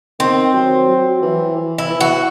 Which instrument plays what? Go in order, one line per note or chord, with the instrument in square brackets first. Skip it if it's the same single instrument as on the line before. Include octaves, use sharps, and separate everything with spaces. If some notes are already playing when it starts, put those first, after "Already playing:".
[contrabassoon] D#3 [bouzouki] C4
[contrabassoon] F#3
F#3
E3
E3
[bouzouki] E4
[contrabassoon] E3
[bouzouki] F#4